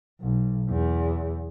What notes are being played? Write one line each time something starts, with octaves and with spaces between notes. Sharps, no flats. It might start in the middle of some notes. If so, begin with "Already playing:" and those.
B1
E2